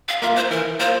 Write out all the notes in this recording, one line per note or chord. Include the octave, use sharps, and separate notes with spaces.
F5
A#3 F4 E5
C5
E3 A#4
A#3 F4 C5